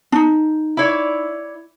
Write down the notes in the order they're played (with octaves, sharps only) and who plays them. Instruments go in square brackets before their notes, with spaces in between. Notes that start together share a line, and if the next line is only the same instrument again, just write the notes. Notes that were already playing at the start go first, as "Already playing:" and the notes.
[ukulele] D4 D#4
[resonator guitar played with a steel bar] E4 C#5 D5